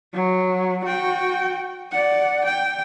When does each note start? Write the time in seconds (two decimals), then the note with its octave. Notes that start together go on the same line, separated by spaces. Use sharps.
0.14 F#3
0.85 F#4 G5
1.92 D5 F#5
2.45 G5